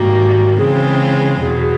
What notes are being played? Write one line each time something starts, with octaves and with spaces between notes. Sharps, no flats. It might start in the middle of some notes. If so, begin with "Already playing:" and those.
Already playing: G#2 D#3 G3 A#3 F#4
C#3 E3 G#3 C4 F4 G#4
E2 B2 F#3 G#4
G#4